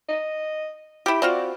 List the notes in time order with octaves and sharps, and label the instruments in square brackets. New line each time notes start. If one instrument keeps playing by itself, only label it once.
[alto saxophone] D#5
[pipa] E4 G4 [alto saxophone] G5
[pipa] C4 F4 F#4 [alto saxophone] D5